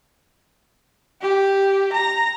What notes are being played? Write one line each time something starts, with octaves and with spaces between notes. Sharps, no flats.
G4
A#5